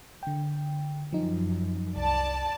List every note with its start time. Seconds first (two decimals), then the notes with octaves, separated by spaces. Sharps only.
0.23 D3 G5
1.12 F#2 F3 D#4
1.96 C2 D5 A5